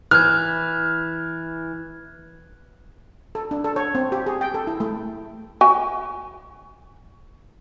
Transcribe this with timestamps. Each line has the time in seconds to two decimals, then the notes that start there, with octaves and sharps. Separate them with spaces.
0.11 E3 F6 F#6 G#6
3.35 A4
3.51 D4
3.64 A4
3.76 C#5
3.95 C4
4.12 G4
4.26 G#4
4.41 G5
4.54 A4
4.67 E4
4.80 A3
5.61 F#4 G#5